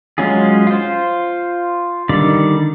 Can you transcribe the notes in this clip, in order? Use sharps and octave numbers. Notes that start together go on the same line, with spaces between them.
F#3 G#3 C#4 F4 G#4
F4 C5
D3 D#3 G3 D5